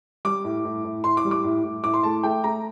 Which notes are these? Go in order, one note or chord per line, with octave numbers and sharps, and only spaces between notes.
G3 D6
A2
A2
A2
A2 C6
D6
G3
D6
A2
A2
A2 D6
C6
A3 A5
A3 G5
A3 A#5